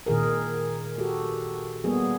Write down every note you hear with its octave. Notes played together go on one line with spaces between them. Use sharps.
A#2 D#3 G#4 A#4
F#4 G4 A4
G3 A#3 B3 G#4